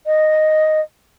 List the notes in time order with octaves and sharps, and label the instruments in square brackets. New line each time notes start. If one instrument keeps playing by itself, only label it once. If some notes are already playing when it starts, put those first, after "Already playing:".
[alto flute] D#5